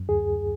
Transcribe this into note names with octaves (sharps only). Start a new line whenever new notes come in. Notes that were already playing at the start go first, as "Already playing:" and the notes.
Already playing: F#2
D2 G#4